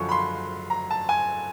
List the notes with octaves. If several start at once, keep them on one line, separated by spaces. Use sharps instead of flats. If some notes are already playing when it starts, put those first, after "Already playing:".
Already playing: F#2 D3 F3 C#6
B5
C6
A#5
A5
G#5